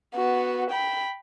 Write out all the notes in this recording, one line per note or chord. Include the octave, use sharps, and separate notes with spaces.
B3 F#4
G5 B5